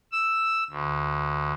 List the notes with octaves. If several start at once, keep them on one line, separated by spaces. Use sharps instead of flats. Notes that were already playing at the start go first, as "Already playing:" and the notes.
E6
D2